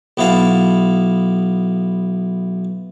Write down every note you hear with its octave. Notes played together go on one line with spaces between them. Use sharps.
B1 B3 E4 F5 A5